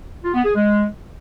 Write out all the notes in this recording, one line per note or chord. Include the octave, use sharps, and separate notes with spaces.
F4
B3
G#4
G#3